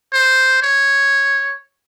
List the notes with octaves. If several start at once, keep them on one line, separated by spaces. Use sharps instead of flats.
C5
C#5